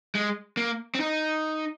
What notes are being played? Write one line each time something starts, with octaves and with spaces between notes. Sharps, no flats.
G#3
A#3
C4
D#4